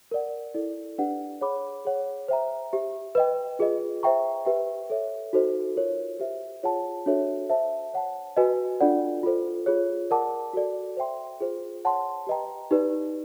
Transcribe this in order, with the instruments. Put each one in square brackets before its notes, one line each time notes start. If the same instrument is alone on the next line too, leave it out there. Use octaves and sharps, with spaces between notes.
[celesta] A#4 D5 F#5
E4 A4 D5
D4 G4 B4 D5 F#5
G#4 C#5 F#5 B5 D6
G#4 C#5 F#5
C5 E5 G5 A#5
G4 C5 E5
B4 D#5 G5
F4 G#4 B4 D#5
C5 E5 G5 A#5 C#6
G4 B4 E5 G5
A4 C#5 E5
D#4 F#4 A4 C5 D#5
F4 A#4 C#5
G4 C5 E5
F4 G#4 C#5 F#5 A5
D4 F#4 A4 C#5 E5
C5 E5 A5
C#5 F#5 A5
F#4 B4 D#5 G#5
D4 F4 A4 D5 F#5
F4 A4 C5
F4 G#4 C#5
A#4 D5 F#5 A5 D6
F#4 A4 D5
C5 E5 G5 C6
F4 G#4 C5
C#5 F#5 A5 C6
G4 B4 D#5 G5 A#5
D#4 G4 B4 D5